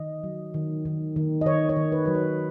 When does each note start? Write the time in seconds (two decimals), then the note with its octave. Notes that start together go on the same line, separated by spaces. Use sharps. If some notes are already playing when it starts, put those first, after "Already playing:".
Already playing: D#3 D#5
0.24 F#3
0.54 D#3
0.85 D#3
1.16 D#3
1.41 D#5
1.46 D#3 C#5
1.69 C#5
1.76 D#3
1.92 B4
2.05 F#3 B4
2.15 C#5